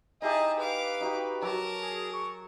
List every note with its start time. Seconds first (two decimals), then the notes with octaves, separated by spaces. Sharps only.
0.22 D#4 E4 G4 G#4 D#5 A5
0.59 B4 F5 D6
1.01 D#4 F#4 G4
1.42 F#3 A#4 A5 A#5 D6
1.81 G#4
2.13 C#6